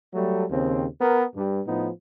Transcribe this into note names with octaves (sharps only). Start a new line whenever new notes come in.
F#3 G3 A3
D#2 C#3 C4
B3 A#4
G2
A2 F3 B3 D#4